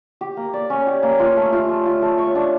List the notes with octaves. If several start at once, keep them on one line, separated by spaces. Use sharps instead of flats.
G4
A#3
D5
C#4
G4
A#3
F4
A3
F4
A3
F4
A3
C#5
D4